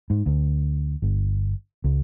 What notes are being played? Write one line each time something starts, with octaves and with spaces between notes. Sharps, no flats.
G#2
D2
G1
C#2